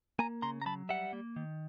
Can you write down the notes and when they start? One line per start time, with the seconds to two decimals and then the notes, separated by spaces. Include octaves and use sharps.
0.19 A#3 G#5 A#5
0.42 C#3 A#5 C6
0.62 A#5
0.66 F#3 A5 B5
0.89 G3 E5 F#5
1.13 A#3
1.36 D#3